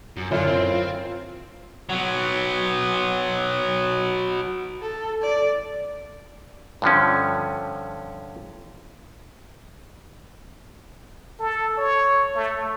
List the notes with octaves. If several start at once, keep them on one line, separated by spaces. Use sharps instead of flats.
F#2
F#2 D3 E4 F4 E5
C4
F#3 B3
A4
D5
G2 D3 F3 C#4
A4
C#5
A3